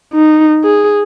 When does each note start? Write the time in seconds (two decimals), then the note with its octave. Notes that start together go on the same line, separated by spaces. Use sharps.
0.14 D#4
0.64 G#4